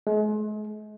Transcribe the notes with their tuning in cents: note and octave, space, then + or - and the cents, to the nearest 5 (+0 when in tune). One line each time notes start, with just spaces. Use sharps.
G#3 +40